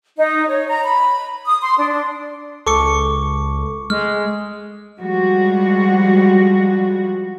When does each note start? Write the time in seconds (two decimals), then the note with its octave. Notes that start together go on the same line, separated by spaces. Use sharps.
0.16 D#4
0.48 C#5
0.67 A#5
0.84 B5
1.45 D#6
1.61 C6
1.79 D4
2.67 C#2 A4 C#6 D6 C#7
3.90 G#3 F6
4.99 F3 G3 G#3 F#4